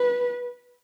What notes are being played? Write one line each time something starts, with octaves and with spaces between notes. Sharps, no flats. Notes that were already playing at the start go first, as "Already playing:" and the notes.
Already playing: B4